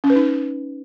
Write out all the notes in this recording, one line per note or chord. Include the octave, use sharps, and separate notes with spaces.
C#4
B4
D#4